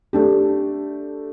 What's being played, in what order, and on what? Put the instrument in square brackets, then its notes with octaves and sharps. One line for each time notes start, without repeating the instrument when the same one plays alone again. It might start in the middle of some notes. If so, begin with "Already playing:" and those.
[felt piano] A3 D4 G4